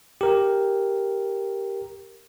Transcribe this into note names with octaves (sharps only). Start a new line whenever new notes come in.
G4 A#4